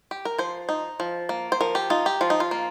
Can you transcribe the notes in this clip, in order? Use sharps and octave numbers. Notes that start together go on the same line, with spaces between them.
G4
A#4
F3 C5
D#4
F3
A#3
C5
F3 A#4
G4
D#4 F4
G4
F3 F4
D#4
F4
A#3